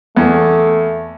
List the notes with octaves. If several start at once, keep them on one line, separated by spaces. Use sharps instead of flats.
E2 A3